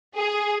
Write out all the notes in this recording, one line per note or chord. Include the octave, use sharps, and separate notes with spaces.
G#4